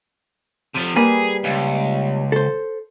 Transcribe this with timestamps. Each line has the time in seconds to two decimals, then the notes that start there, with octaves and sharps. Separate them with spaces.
0.75 C3 F3
0.96 G3 A#3 G#4 B4
1.44 C#2
2.32 A4 C5